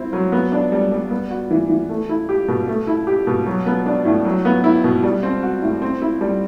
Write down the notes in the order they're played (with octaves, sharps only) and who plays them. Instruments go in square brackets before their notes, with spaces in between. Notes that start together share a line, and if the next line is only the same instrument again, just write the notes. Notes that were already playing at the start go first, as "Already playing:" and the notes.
Already playing: [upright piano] C4 E4
F#3
B3
D4
G3
G3
B3
F#4
E3
E3
A3
E4
G4
B2
A3
E4
G4
B2
F#3
B3
D4
A2
F#3
B3
E4
B2
G3
C4
F#4
A2
C4
E4
G3